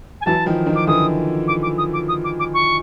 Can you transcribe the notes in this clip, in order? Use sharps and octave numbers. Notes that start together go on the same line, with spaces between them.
G#5
E3 F#3 A5
D#3 F3
D#3 F3
D6
D3 E3 D#6
D6
D6
D#6
D6
D#6
D6
D6
C#6